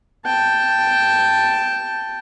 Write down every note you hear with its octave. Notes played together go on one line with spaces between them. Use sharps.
G5 A5